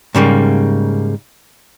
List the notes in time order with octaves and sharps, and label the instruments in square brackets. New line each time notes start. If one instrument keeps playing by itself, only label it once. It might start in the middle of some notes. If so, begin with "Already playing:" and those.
[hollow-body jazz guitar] G#2 C#3 G3 A#3